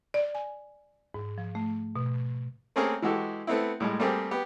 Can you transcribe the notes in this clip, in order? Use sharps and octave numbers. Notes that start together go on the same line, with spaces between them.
D5
G#5
G#2
F3
A3
B2
A3 A#3 C4 C#4 G#4 A#4
E3 G#3 F#4 G4 A4
A3 B3 C4 E4
A2 G3 G#3
G3 A3 A#3 C4 G4 G#4
B3 G4